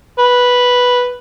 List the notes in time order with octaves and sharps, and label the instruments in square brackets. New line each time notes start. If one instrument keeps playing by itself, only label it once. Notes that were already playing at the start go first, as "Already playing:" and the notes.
[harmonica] B4